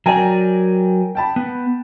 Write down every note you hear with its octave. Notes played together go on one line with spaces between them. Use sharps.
F#3 A#4 D5 G5 G#5 A#5
G5 A5 B5
B3